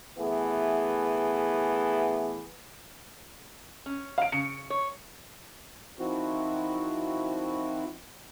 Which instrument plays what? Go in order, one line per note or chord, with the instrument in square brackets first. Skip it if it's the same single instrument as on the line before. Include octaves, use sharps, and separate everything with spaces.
[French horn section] E3 A3 B3 G#4
[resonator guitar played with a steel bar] C#4
[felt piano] F5 D7
[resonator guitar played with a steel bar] C#3 [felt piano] C#7
[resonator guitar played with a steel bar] C#5
[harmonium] D#3 F3 C4 E4 F#4